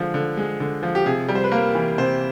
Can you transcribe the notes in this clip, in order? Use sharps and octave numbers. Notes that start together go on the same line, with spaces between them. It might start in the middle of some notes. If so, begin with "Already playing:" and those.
Already playing: D3 F3 G#3
D3
G#3
D3
F3
G4
C3 G#4
G3
C5
B4
A#3 A#4
E3
C3 C5